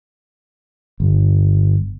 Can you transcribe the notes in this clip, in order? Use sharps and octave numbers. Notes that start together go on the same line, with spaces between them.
G1